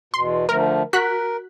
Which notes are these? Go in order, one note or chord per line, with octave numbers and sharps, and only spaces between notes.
E2 B2 C6
D3 F3 A3 A#4
F#4 A#4 F#6 B6